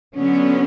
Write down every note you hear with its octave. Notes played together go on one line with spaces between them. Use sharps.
D3 F#3 B3 C#4